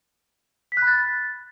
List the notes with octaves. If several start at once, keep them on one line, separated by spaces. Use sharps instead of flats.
B6
F#6
B5
A6